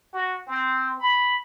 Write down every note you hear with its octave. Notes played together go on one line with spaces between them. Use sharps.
F#4
C4
B5